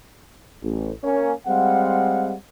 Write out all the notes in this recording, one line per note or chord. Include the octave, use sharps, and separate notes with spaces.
A1
A#3 C#4
G3 G#3 C4 F5 F#5